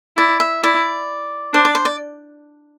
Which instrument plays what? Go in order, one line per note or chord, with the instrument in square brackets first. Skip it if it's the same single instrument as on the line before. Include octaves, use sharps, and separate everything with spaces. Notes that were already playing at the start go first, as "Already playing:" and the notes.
[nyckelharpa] E4 [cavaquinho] D5
[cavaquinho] E5
[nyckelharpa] E4 [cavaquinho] D5
[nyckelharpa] D4 [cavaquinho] C5
[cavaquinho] D5
C5
D5